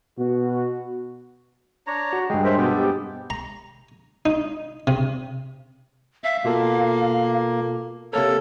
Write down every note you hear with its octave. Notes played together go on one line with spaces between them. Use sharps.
B2 F#4
D4 C#5 A#5
F#4
G2 G#3 G#4 G5
C#4 D#4 A#4 C5 E5 G5
B2 B3 A4 G5 D6
G4
A#5
D#4
C3
E5 F5
B2 A#3 F4 A4
C3 A#3 A4 A#4 C#5